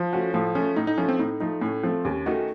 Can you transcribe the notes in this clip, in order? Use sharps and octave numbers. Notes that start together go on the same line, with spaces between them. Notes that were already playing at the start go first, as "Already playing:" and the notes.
Already playing: F3
A3 C#4 F#4
A2 F3
F3 A3 C#4
A2 D#4
D#4
F3 A3 C#4
C4
A2 D#4
F3 A3 D#4
A2 C#4
F3 A3 C4
D#2 C#4
D#3 A3 D#4 F#4